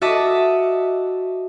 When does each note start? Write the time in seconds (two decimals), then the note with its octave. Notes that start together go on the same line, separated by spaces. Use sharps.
0.01 F#4 D#5 E5 A5 D6